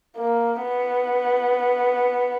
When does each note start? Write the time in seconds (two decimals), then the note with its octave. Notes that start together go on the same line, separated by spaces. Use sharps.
0.17 A#3
0.62 B3